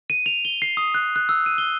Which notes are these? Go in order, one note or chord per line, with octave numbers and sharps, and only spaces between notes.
D#7
F7
G7
C7
D#6
F#6
F#6
E6
D#7
G7